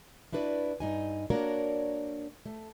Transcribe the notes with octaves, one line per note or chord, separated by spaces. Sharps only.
D4 E4 F#4 B4 C#5 D5
G2 D#4 G#5
A#3 D4 F#4 A#4 C#5 D5
A3